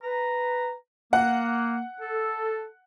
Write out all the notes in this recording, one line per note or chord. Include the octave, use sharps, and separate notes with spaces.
B4 A#5
A#3 F#5
A4